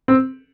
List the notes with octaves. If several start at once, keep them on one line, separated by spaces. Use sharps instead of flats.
C4